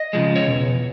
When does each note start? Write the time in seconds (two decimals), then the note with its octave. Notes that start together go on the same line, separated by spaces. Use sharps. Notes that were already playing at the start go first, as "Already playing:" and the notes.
Already playing: D#5
0.13 C#3 F3 G#3
0.36 C#5
0.46 E2 B2